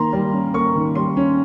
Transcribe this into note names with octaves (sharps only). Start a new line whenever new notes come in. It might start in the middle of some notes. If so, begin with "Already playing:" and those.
Already playing: D#3 A#3 A#5 C6
G3
C#4
A#3 C#6
D#3
G3 C6
C#4